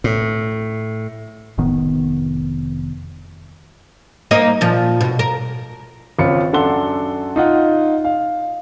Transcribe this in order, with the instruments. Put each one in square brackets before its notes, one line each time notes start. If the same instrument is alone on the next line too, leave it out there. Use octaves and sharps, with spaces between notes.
[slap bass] A2
[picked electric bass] F1 A2 D#3 B3
[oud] A#3 D#4 D#5
A#2 F3
B2
A#4
[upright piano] G#1 C#2 F4 C#5 B5 C#7
F#2 D4 A4 F#5 C6 G7
D#4 F4 F#5
F5